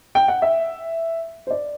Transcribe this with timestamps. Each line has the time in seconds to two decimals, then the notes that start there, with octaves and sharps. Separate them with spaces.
0.15 G5
0.28 F#5
0.42 E5
1.47 C5
1.51 D5